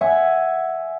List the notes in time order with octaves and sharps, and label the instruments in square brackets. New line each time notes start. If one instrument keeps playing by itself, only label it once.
[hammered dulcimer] E5 F#5 G#5